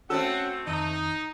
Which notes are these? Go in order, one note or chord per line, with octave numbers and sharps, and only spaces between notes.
A3 C4 C#4 F#4 A4 F#5 E6
F2 D#3 D#4